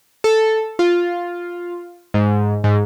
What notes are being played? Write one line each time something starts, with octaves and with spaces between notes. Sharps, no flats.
A4
F4
G#2
G#2